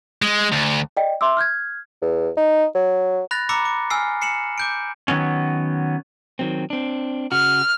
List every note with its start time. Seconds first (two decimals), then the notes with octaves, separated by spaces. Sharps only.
0.22 G#3
0.52 D2
0.97 D5 D#5 G5
1.21 E5 C6 D6 E6
1.37 F6 G6 G#6
2.02 E2
2.37 D#4
2.75 F#3
3.31 B5 F#6 A6 A#6
3.49 A#5 B5 D6 E6 C#7
3.65 D6
3.90 G#5 E6 F6 C7
4.22 C7 C#7 E7 F#7
4.58 D6 G6 D7
5.08 D#3 F#3 B3 C#4
6.39 D#3 F#3 C4
6.70 C4 D4
7.32 C#3 F#4 F6